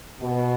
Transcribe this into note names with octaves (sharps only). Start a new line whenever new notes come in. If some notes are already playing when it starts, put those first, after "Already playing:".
B2